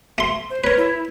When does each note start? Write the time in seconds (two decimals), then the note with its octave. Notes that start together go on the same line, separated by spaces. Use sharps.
0.18 A3 C6
0.50 C5
0.64 A#4 B4 C#5
0.77 E4